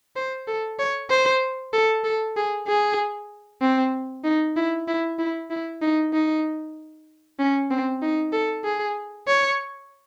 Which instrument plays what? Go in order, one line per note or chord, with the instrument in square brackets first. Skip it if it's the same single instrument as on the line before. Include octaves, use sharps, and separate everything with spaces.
[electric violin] C5
A4
C#5
C5
A4
A4
G#4
G#4
C4
D#4
E4
E4
E4
E4
D#4
D#4
C#4
C4
D#4
A4
G#4
C#5